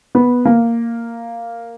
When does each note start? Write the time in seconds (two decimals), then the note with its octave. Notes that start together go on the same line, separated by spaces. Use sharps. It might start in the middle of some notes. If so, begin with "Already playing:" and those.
0.15 B3
0.45 A#3